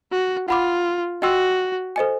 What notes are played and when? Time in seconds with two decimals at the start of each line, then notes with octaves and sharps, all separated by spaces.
0.11 F#4
0.48 F4 F#5 B5 D6
1.22 F#4 D#5 G5 C6 E6
1.96 A4 C5 D#5 G#5